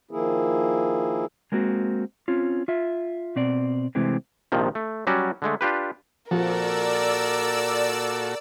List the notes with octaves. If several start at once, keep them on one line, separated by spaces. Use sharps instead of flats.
D#3 F3 A#3 E4 G#4
G#3 A#3 C4 F#4
C4 C#4 F4
F4 E5
B2 C4 D5
C3 E3 G#3 A3 C4
A#1 C3 D#3 F3
A3
F#3 G3 C#4 F#4 D5
D3 G#3 A3
D4 F4 G4 B4
A#2 F3 F#4 A4 A#4 D5 E6